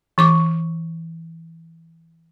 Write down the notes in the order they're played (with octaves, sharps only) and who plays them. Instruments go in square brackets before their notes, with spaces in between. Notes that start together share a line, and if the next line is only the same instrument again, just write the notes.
[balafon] E3 C#6 D6